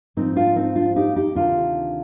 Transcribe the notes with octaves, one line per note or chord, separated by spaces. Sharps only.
G#2 F3 C4 D#4
D4 F4
C4 D#4
D4 F4
D#4 G4
D#4 G4
D2 C3 D#3 D4 F4